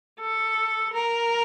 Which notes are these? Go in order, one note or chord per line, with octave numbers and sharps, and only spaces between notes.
A4
A#4